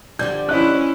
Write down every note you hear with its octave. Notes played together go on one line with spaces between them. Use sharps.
D3 F3 G3 G6
C#4 E4 C5 D#5 F#6